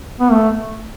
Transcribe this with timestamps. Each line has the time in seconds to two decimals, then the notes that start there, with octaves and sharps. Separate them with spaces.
0.20 B3
0.32 A3